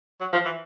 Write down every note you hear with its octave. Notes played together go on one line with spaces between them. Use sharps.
F#3
F3
E3